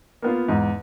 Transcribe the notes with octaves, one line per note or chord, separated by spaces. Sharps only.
A#3 B3 F4
E2 G#2